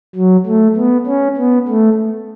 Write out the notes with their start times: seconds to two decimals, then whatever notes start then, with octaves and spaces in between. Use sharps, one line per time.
0.16 F#3
0.46 A3
0.76 B3
1.07 C#4
1.37 B3
1.68 A3